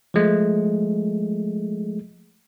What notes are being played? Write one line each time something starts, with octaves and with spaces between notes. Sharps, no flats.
F3 G#3 A3